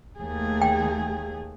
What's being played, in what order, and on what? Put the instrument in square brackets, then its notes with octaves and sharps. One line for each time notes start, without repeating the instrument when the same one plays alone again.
[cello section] D#2 A3 G#4
[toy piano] G5